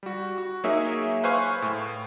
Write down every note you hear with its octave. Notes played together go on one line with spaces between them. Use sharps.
G3 F#4
F#4
F#3 A#3 D#4 G#4 C#5 E5
B4 C5 E5 F5 G#5 C#6
A2